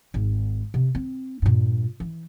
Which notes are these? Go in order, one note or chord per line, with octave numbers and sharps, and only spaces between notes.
G#1
C3
C4
G2 A#2
E3